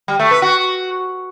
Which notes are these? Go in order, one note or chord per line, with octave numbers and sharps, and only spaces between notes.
G3
A3
B4
F#4